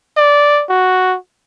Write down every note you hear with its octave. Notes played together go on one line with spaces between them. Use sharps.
D5
F#4